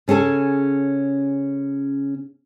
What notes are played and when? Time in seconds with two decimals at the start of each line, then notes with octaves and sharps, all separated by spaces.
0.08 C#3 C#4 G#4 A4 G#5